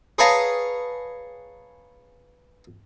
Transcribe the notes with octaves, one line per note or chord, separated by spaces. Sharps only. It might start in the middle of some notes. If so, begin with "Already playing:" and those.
G#4 B4 C#5 F5 A5 A#5